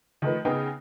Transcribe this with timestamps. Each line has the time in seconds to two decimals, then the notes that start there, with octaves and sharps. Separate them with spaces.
0.22 D#3 F3 A3 D#4 B4
0.45 C#3 B3 D#4 G#4 G5